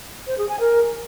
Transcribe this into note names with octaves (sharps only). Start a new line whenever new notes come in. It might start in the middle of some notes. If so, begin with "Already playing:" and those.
C5
G#4
G#5
A#4